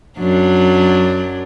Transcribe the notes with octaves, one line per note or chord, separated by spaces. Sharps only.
F#2 F#3 D4